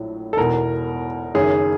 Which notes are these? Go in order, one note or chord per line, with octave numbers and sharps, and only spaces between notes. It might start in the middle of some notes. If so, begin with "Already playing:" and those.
Already playing: A#1 A2 F#3
A4
E1 E2 B2 A#4
F#1 F#2 D#3 G#4